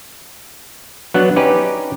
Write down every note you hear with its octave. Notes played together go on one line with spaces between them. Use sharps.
F#3 B3 D4 F#5
C#4 D#4 G4 B4 D5